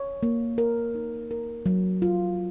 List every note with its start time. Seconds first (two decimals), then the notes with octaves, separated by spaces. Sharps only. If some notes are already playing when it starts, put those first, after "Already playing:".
Already playing: C#5
0.23 A#3
0.58 A#4
0.95 D#4
1.31 A#4
1.66 F#3
2.02 F4